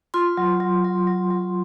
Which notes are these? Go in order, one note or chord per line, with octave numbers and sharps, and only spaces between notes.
F4 C6
F#3
F#3
F#3
F#3
F#3